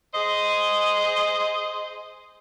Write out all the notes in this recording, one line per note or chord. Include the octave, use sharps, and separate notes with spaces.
G#4 C5 D#5